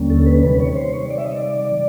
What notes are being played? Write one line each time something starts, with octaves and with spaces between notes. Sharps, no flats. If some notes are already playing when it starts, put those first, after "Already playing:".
Already playing: D#2 D3 G3 A#3 C#4
A4
B4
C3 D#3 G3 B4
C#5
C5
C#5
D5
E5
D#5
D5